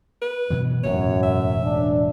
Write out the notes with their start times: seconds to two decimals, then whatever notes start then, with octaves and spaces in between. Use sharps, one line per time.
0.22 B4
0.50 B2 E3 F#3
0.84 E1 F#2 A2 F#3 C#5
1.23 E5
1.63 D4